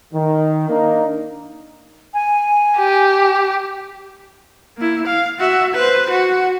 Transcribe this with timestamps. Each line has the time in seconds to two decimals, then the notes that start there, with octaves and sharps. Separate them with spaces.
0.14 D#3
0.69 A#3 D4 D#4
2.13 G#5
2.78 G4
4.77 A#3 E4
5.07 F5
5.39 F#4 E5
5.75 B4 C5
6.10 F#4